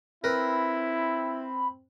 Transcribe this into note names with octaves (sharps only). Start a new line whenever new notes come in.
C4 E4 A#4 B4 B5